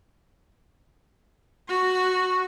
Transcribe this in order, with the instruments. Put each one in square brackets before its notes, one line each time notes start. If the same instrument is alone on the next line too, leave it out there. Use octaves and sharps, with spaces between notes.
[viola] F#4 C#6